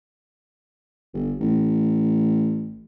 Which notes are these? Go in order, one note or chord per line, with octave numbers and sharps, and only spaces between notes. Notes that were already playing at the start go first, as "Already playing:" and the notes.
G1
A1